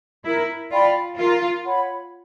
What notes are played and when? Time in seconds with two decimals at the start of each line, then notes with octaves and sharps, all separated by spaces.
0.24 E4 A#4
0.71 F4 D5 G5 B5
1.17 F4 A#4
1.64 C#5 F#5 B5